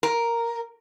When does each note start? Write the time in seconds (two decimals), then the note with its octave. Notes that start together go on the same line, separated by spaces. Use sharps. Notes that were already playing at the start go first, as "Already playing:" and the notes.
0.03 A#4